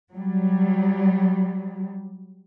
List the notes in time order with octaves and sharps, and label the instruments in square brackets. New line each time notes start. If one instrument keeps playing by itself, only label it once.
[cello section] F#3 G3